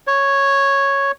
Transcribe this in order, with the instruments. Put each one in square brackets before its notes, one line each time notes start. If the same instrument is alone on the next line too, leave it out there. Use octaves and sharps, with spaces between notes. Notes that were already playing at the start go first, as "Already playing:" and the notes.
[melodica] C#5